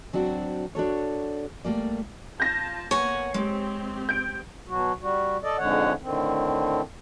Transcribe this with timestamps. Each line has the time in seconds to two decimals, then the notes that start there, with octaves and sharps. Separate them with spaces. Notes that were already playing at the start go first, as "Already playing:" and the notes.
0.13 F#3 C4 D4 F#4
0.75 D4 F#4 A4 C#5
1.64 G3 A3 A#3 D5
2.40 F4 A5 G6 A#6
2.91 A#3 B3 C#5 F#5 G#5
3.34 G#3 C4 G4
4.09 G6 D7
4.68 B2 F#3 F#4
5.01 G3 F#4
5.43 A4 D5 D#5
5.58 F2 G#2 D3 G#3 C#5 F#5
6.02 A2 D3 D#3 C4